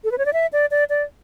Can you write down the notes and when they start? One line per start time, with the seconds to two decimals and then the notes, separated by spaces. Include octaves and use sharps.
0.04 A4
0.12 B4
0.18 C#5
0.26 D5
0.33 E5
0.53 D5
0.71 D5
0.90 D5